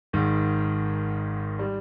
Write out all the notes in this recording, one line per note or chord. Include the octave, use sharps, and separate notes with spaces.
G#1 G#2 D#3
G3